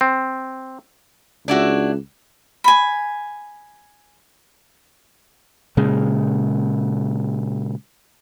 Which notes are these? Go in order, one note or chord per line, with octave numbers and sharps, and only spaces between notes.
C4
C#2 D4 E4 F#4
G#5 B5
A#2 C#3 G#3